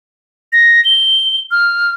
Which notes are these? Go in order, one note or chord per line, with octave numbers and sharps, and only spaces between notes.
A#6
G7
F6